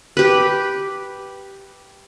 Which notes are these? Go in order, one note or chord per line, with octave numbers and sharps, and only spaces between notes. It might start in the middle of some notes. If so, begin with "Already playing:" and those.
G4 B4